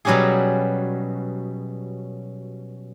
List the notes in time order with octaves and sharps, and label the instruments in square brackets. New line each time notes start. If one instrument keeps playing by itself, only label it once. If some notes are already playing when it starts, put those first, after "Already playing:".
[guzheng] B2 F#3 G3 C#4 G4 G#4